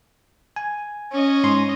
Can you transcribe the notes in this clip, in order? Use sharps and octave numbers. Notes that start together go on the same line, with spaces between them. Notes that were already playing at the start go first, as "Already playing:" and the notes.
G#5
C#4 D#5
G#2 C6